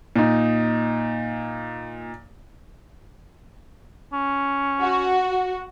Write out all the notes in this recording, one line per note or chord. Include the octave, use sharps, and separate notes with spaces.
A#2 D#4
C#4
F#4